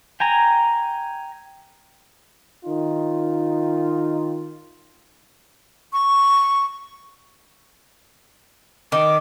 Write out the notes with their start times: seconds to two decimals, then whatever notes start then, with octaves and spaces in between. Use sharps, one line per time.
0.20 G5 G#5 A#5
2.65 D#3 D#4 F4
5.93 C#6
8.92 D#3 D6